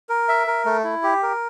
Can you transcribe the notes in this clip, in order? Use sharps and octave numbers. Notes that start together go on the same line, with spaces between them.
A#4
E5
A#4
A3
E4
G4
A#4